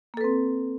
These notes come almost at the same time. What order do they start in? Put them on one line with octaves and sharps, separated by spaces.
A#3 A4 B4 C4